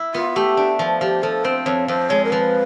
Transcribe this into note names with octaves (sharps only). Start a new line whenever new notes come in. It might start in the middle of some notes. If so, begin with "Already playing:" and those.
Already playing: E4
B3 F4
A3 G4
D4
F3
F3 G4
F3 A4
C4 C5
F2 C#5
F2 C5
G#3 C#5
A#4
F3 B4